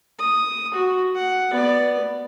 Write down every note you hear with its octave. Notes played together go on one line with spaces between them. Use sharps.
D#6
F#4
F#5
B3 D5